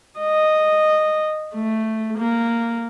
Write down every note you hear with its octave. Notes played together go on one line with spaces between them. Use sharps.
D#5
A3
A#3